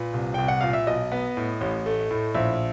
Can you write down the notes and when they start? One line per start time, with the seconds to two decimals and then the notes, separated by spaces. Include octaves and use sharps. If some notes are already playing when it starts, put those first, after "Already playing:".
Already playing: A#2 B4
0.14 C2
0.34 C2 G5
0.48 F#5
0.61 A#2 F5
0.73 E5
0.87 B1 D#5
1.12 B3
1.37 A2
1.61 A1
1.86 A3
2.11 A2
2.34 A#1 E5